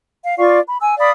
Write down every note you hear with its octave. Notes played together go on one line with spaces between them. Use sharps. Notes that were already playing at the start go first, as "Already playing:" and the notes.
F5
F4 D5 F5 C#6
B5
G#5 E6
D5 F5 B5 D#6